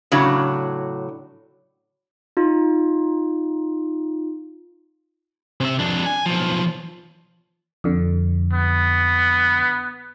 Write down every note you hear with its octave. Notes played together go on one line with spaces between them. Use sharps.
A2 C#3 F#3 D4
D#4 F4
C3 E5
F2 D4
G#5
B1 F3
F2 D3
B3